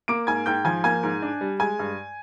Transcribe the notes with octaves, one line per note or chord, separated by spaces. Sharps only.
A#3 D6 D7
G#2 G#5 G#6
G#2 G5 G6
F3 G#5 G#6
A#3 G#5 G#6
G#2
D4
G3
G#3 G#5 G#6
G2